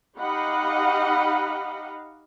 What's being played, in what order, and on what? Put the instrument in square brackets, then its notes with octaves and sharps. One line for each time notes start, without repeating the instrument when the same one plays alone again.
[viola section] D#4 G4 D#5 F5 F#5 B5